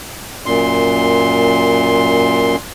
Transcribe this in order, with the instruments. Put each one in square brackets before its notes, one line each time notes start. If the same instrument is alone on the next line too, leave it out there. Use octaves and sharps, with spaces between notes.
[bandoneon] F#2 A#2 C6